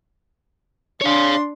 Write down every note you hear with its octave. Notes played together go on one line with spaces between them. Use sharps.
D4 C#5 F5 C6